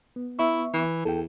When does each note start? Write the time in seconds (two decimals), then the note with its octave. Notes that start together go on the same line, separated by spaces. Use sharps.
0.16 B3
0.39 B3 E4 E5 C#6
0.74 E3
1.05 E2 A4 G5